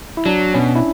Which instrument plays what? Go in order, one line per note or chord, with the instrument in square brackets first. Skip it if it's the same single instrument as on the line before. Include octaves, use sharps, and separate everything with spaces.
[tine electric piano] E4
[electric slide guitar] F#3 [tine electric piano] D4
[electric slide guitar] B2 [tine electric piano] C#4
[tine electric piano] E4